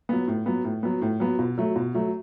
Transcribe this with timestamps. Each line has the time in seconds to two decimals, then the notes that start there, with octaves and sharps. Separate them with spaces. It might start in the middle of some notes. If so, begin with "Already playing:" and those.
0.09 F#3 B3
0.28 A2
0.46 F#3 B3
0.64 A2
0.83 F#3 B3
1.02 A2
1.20 F#3 B3
1.39 B2
1.58 F#3 A3
1.76 B2
1.94 F#3 A3